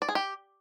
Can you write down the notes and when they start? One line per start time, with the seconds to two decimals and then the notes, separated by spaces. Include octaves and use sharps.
0.02 D5
0.09 G#4
0.15 G4